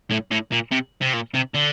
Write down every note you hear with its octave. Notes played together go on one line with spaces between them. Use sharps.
A2
A2
A#2
C3
C3
A#2
C3
D3